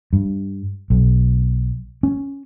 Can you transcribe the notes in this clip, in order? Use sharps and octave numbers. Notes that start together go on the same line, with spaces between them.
G2
B1
C#4